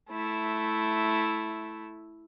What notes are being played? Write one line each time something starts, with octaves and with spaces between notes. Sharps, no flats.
A3 E4